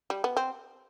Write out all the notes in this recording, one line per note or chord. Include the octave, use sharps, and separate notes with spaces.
G3
B3
C4